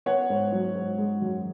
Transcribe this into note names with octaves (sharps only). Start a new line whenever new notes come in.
B3 C#5 F#5
G#2
F#3
G#2
G#3
F#2